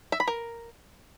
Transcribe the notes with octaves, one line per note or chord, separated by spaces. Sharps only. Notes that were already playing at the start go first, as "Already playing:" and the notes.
E5
B5
A#4